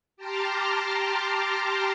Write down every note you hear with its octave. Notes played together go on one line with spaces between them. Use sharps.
G4 A5 A#5 C6 D6 F6